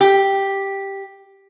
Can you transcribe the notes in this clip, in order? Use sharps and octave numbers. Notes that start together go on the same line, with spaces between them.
G4